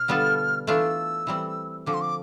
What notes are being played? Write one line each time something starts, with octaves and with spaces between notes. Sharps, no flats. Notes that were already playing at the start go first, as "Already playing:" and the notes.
Already playing: B2 F6
D3 G3 B3 F4 A4
E3 A3 D4 F4 E6
E3 G3 C4
D3 F3 C4 D6
C6
D6